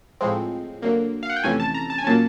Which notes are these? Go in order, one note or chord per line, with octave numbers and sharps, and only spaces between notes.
A2 F3 G#3 C4
D3 F#3 A#3
F5
F#5
G5
F2 C3 E3 A3 C#4 G#5
A5
A#5
A5
G#5
A#2 F#3 A#3 C#4 A5